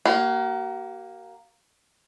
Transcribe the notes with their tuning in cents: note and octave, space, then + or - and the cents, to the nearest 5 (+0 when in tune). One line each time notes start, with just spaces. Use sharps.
A#3 +0 F#4 +45